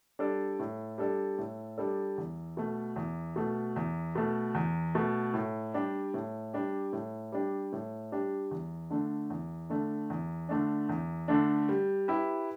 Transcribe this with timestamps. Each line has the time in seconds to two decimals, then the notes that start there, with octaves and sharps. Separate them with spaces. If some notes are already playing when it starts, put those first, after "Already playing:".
0.19 G3 D4 A4 D5
0.59 A2
0.98 G3 D4 A4 D5
1.38 A2
1.78 G3 D4 A4 D5
2.18 E2
2.57 B2 A3
2.96 E2
3.36 B2 A3
3.76 E2
4.15 B2 A3
4.55 E2
4.95 B2 A3
5.34 A2
5.74 G3 D4 G4
6.14 A2
6.53 G3 D4 G4
6.93 A2
7.32 G3 D4 G4
7.73 A2
8.12 G3 D4 G4
8.51 E2
8.90 D3 A3 D4
9.30 E2
9.70 D3 A3 D4
10.10 E2
10.49 D3 A3 D4
10.89 E2
11.28 D3 A3 D4
11.69 G3
12.08 E4 G4 B4